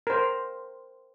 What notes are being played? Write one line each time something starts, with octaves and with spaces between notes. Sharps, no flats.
A#4 C5